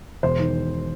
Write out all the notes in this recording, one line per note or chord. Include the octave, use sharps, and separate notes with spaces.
E1 C5
D#3